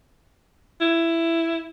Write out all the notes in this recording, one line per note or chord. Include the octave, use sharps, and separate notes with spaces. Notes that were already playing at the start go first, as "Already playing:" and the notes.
E4